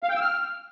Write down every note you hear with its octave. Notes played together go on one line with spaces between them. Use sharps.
F5
G5
E6
F6